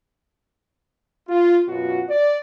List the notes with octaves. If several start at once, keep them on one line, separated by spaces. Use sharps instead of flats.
F4
F#2 B2 F4 F#4
D5